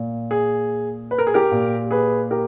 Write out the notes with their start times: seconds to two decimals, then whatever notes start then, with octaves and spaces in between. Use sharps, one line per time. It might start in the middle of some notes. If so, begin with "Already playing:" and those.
Already playing: A#2
0.31 G#4
1.11 B4
1.18 A#4
1.27 G#4
1.34 G4 A#4
1.52 A#2
1.91 G#4 B4
2.31 G4 A#4